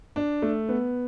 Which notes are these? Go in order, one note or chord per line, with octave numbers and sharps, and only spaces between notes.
D4
A3
B3